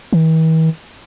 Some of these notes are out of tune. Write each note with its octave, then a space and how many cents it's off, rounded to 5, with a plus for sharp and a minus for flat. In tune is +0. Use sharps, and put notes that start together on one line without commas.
E3 -45